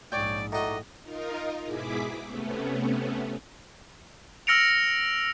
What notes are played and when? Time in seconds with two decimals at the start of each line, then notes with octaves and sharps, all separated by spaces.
0.12 A#1 G#2 C#5 D5 G5
0.52 A2 D#4 F#4 D5 D#5
1.02 D#4 F4 A#4 D#5
1.65 G#2 B2 E4 G#4 D6 B6
2.24 C3 A3 B3 C#4
4.47 E6 F6 A#6 C#7 D7 F7